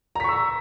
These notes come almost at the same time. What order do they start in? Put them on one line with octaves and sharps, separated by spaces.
A#5 B6 C#6 E6